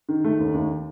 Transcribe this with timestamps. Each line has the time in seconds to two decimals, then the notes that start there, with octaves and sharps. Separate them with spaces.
0.09 D#3
0.24 A3
0.39 D#2
0.54 D#2